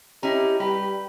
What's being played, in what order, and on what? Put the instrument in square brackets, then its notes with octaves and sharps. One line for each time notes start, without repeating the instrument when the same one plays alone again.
[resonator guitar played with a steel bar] C#4 E4 [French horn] G4 [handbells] D#5 A#5
[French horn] G3 [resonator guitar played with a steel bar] G4 B4 [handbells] B5